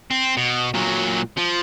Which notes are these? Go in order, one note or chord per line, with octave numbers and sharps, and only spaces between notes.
C4
B2
A#2 F#3
F3